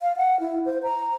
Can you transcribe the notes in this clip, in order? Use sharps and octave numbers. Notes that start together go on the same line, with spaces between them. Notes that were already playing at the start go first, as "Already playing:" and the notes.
F5
F#5
E4
C5
A#5